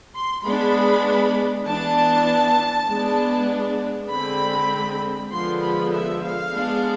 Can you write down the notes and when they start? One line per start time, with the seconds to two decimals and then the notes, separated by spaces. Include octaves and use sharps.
0.15 C6
0.45 G#3 B3 D4 B5
1.67 E3 B3 D4 A5
2.89 G#3 B3 D4
4.10 D3 G#3 C4 B5
5.31 D3 F3 G#3 B3 C6
5.62 B5
5.93 E5
6.22 F5
6.53 G#3 B3 D4